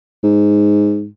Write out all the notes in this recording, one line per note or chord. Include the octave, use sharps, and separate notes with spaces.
G#2